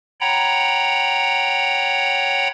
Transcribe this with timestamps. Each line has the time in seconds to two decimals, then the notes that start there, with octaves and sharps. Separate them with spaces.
0.21 C#5 F#5 G5 A#5 B5